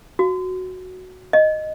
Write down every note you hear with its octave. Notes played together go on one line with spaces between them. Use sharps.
F#4
D#5